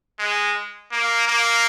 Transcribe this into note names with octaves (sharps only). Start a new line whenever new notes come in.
G#3
A#3
A#3